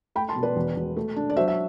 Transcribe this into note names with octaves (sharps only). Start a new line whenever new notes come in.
A3 G5 B5
A5 C6
B2
B4 D5
E1
E1
A3
D4
D5
F#3 C5 E5
E5